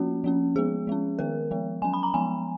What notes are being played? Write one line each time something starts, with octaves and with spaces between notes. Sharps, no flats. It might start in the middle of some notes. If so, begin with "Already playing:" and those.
Already playing: F3 A#3 C#4 F#4
F3 A#3 C#4
F3 G#3 B3 G#4
F3 G#3 C#4
D#3 G#3 B3 A#4
F3 G#3 B3
F#3 C#4 G#5
B5
A#5
F3 G#3 B3 G#5